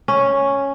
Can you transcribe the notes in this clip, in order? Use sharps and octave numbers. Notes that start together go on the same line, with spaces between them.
C#4